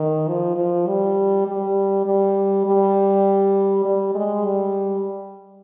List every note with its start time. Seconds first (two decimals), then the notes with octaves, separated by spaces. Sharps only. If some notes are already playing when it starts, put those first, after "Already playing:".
Already playing: D#3
0.28 F3
0.57 F3
0.87 G3
1.47 G3
2.06 G3
2.66 G3
3.85 G3
4.15 G#3
4.45 G3